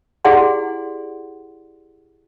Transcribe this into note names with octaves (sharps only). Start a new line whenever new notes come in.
E4 G4 G#4 D5 F#5 C6